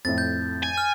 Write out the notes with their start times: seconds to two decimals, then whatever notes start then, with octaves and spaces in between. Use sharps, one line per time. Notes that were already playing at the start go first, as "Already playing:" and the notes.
0.05 F2 A2 A6
0.18 G6
0.63 G#5
0.77 F6